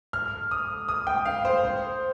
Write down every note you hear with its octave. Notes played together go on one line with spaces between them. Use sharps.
F6
D#6
D#6
G5
F5
C5
C5